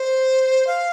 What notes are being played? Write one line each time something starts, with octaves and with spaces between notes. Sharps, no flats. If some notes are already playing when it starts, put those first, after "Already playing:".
Already playing: C5
F5